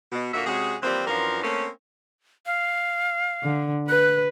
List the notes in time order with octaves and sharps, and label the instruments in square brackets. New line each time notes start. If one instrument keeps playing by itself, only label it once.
[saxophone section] B2
A#2 D3 A#3 F#4 E5
C3 G#3 C#4 F#4 G#4
E3 F3 G3 A#3 C4
F#2 E3 F3 D4 F4 A#4
A3 A#3 C4 C#4
[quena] F5
[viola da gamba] D3
[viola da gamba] B4 [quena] F#6